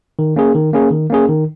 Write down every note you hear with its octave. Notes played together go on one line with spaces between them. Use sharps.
D#3
A#3 C#4 G#4
D#3
A#3 C#4 G#4
D#3
A#3 C#4 G#4
D#3